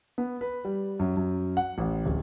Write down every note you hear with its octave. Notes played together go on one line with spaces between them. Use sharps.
B3
B4
G3
F#2
F#2
F#5
A1
D1